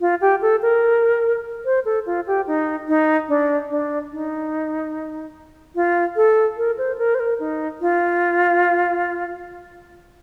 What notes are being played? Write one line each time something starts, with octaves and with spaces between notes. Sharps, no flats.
F4
G4
A4
A#4
C5
A4
F4
G4
D#4
D#4
D4
D4
D#4
F4
A4
A#4
C5
A#4
C5
A#4
D#4
F4